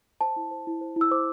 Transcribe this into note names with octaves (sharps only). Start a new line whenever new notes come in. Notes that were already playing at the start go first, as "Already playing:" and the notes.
C5 A5
E4
C5
E4
C5
E4
E6
C5 D6